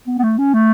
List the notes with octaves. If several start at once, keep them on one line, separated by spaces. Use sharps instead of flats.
B3
B3
A3
C#4
A3